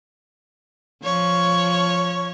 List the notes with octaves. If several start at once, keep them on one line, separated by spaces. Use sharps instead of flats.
F3 C#5